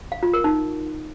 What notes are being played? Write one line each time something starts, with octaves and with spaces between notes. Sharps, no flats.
F5
F4
A#4
D#4